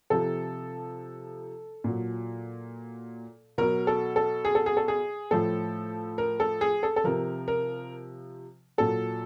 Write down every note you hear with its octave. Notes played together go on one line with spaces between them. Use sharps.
C3 F3 A4
A#2 F#3
B2 F#3 A#4
A4
A4
G#4
A4
G#4
A4
G#4
A2 F3 A4
A#4
A4
G#4
A4
A4
C3 F3 A#4
A#4
A#2 F#3 A4